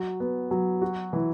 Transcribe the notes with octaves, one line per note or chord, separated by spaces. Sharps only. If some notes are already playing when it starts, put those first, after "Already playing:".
Already playing: F#3
B3
F#3
F#4
E3